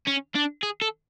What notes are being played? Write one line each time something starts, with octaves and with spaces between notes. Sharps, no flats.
C#4
D4
G#4
A4